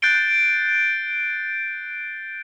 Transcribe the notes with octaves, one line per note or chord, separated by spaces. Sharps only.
F#6 G6 A6 C7 D7 G7